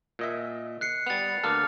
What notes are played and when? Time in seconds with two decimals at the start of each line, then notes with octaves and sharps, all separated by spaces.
0.19 A#2 D#5 E5
0.81 F#6 C7 C#7
1.06 G3 B3 A6 F7
1.44 D2 A#3 A4 D6 F6